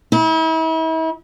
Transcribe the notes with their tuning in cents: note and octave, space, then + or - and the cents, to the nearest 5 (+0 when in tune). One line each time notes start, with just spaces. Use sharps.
E4 -40